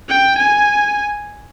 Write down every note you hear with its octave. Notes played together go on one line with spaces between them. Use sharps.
G5
G#5